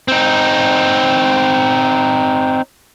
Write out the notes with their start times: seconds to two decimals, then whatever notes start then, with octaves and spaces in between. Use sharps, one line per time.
0.08 C4 D#4